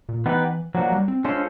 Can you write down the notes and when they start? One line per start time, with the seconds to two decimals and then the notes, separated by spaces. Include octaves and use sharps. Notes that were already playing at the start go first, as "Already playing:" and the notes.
0.09 A#2
0.26 E3 B3 D#4 G4 B4
0.74 F3 F#3 A#3 D4 F#4
0.92 G3
1.08 C4
1.24 G#3 C#4 D4 F4 A4 C5